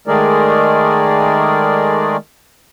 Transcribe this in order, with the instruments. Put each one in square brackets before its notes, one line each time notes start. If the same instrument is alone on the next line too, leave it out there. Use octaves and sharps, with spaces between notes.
[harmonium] D#3 G#3 A3 G#4 A#4 D5